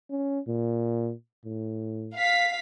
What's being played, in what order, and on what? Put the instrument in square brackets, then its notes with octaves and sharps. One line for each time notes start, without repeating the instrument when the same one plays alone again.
[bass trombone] C#4
A#2
A2
[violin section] F5 B6